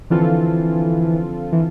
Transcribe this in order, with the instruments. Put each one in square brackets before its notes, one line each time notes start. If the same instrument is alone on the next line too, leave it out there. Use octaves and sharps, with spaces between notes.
[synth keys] D3 F3 C4 F4 A4 [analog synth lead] E3
[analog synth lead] E3